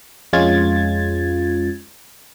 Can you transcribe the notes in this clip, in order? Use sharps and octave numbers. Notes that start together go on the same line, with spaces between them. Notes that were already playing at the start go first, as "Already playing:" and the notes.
F2 G#3 C#4 F4 G#6 A6